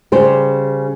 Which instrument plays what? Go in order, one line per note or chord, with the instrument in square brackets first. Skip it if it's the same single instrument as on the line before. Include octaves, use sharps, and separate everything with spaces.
[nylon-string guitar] C#3 G3 C5